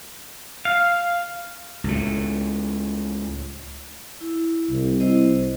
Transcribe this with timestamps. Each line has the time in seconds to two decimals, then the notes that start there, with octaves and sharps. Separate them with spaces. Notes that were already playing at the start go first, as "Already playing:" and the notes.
0.65 F5
1.84 C#2 A2
4.21 E4
4.70 C2
5.00 E4 C5 D#5